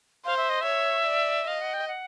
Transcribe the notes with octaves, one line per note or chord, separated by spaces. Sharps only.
C5 F5
E5
D#5
C#5 E5
D5
D#5 F5
F#5
G5
F#5